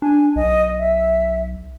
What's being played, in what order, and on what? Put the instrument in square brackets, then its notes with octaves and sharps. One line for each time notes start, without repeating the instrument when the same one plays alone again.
[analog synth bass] D4 [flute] G#5
[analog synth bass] B1 [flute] D#5
[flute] E5